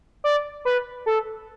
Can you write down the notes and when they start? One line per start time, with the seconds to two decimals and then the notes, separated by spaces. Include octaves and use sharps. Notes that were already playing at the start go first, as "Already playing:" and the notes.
0.24 D5
0.65 B4
1.06 A4